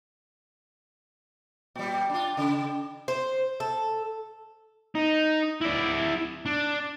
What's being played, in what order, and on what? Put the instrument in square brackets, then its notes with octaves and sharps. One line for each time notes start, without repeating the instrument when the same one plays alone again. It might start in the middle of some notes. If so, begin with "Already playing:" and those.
[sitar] A#2 G3
D4 F4
C#3
[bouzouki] C5
A4
[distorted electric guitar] D#4
E4 D5
D4